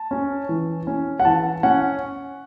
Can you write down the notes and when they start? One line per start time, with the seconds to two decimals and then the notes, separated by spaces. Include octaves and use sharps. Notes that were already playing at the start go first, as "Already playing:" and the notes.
Already playing: A5
0.11 C#4
0.49 E3
0.87 C#4
1.20 F#5
1.25 E3 A5
1.63 C#4 F#5